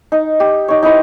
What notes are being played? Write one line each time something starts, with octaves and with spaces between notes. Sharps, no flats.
D#4
G4
D#4 C#5
D#4 E4 B4 C5